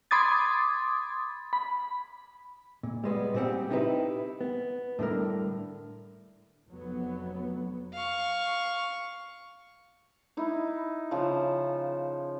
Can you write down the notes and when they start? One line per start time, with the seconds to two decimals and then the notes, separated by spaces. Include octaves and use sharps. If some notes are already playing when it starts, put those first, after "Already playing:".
0.11 B5 C6 D6 D#6 G#6 A6
1.53 B5
2.83 A#2
3.04 G3 G#3 B3
3.34 A#2 G3 C4 G4 F#5
3.70 B3 C4 D#4 E4 G4 B4
4.41 B3
4.99 A2 D3 G3 A#4
6.68 F1 F#3 B3
7.93 F5 C#6
10.37 D#4 E4
11.11 C#3 F3